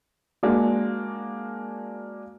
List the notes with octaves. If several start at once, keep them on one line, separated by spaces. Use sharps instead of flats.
G#3 A#3 D4 F#4